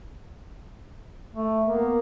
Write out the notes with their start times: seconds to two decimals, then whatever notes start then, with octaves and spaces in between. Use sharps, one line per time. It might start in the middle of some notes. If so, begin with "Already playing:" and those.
1.35 A3
1.68 A#3 B3